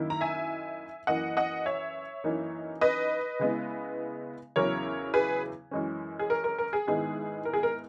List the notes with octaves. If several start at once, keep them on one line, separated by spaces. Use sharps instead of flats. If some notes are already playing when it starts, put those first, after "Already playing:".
Already playing: F#2 D#3 A#3 E4
A#5
E5 G#5
F#2 E3 A#3 D#5 F#5
D#5 F#5
C#5 E5
F#2 E3 A#3 D#4
B4 D#5
C#3 G#3 B3 E4
E2 C#3 F#3 C#4 E4 A#4 C#5
G#4 B4
F#2 E3 G#3 C#4
G#4
A#4
A#4
A#4
G#4
G#2 D#3 G#3 B3 E4 G#4
A#4
G#4
A#4